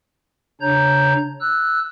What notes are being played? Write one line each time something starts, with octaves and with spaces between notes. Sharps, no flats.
C#3 D4 C#5 A#5 G6
E6 F#6